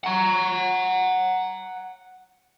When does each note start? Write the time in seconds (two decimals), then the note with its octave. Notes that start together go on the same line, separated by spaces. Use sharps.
0.04 F#5 A#5